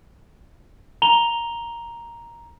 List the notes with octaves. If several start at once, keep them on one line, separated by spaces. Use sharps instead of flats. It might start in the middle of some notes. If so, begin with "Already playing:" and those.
A#5 F7 G7